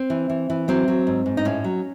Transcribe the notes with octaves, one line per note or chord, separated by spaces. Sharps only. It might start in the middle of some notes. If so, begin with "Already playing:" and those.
Already playing: C4
E3
E3
E3
F#3 C4
F#3
G#2
G#2
D#4
A2 C#4
F#3